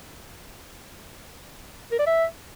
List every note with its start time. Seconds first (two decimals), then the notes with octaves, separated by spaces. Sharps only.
1.92 A#4
1.99 D5
2.07 E5